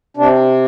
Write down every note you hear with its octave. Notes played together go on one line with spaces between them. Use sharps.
C3 D4